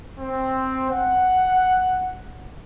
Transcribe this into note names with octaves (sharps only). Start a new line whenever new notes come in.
C4
F#5